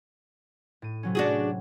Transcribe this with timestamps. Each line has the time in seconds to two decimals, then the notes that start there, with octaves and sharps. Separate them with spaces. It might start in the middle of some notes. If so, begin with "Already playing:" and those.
0.82 A2 D#7
1.03 C3 F#3 C#4
1.15 D4 F#4 G#4